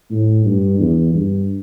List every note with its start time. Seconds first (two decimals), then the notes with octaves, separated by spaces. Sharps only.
0.11 A2
0.46 G2
0.80 E2
1.15 G2